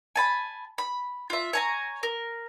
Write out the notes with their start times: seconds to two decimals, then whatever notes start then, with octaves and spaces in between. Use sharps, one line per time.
0.16 G#5 A5 B5
0.78 B5
1.30 F4 E5
1.53 C#5 G#5 A#5
2.03 A#4